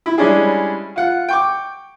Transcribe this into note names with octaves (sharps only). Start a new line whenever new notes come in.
E4
G3 G#3 C#4 D4 E4 G#4
F4 F#5
G5 C#6 D6